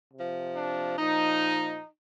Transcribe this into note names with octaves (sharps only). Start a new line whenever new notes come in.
C3 F3
D4
A#2 F3 D#4